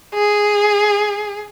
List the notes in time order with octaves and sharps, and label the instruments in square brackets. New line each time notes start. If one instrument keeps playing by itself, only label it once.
[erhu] G#4